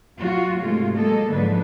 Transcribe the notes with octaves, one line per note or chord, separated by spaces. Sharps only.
F#3 F4 F#4
G#2 C3 G#3 A3 F4
F#3 G#3 A#3 A4 D#5
G#2 D3 F3 F#3 D4 B4